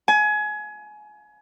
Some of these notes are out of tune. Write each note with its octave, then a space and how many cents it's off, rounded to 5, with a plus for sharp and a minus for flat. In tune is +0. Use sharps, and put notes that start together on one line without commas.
G#5 +25